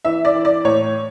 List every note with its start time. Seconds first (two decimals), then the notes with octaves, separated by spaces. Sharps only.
0.05 E3 E5
0.25 D5
0.35 E3
0.45 D5
0.65 A2 C#5